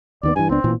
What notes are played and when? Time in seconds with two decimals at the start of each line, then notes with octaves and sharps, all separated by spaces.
0.23 D#2 D#3 B3 D5
0.36 G2 E3 G#5
0.50 C#2 B3 C4 D4
0.64 A1 A#2 E3